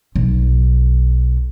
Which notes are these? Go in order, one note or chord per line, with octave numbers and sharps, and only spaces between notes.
B1